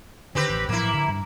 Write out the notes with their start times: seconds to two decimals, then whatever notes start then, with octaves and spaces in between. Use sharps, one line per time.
0.35 D3 D#3 C4 G4 B4
0.50 A1
0.69 A2 F3 F#3 A#3 E4
0.94 D3
1.08 G2